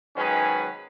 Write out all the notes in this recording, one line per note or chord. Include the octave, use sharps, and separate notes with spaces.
G#2 D#3 F#3 C#4 G#4 B4